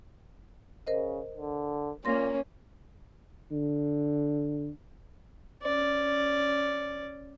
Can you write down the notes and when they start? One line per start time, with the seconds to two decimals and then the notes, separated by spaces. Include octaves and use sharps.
0.87 C#3 A#4 C5 D#5
1.37 D3
2.05 A#2 A#3 C#4 C6 A#6
3.51 D3
5.63 C#4 D5